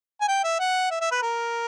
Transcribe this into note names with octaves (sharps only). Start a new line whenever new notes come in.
G#5
G5
E5
F#5
E5
E5
B4
A#4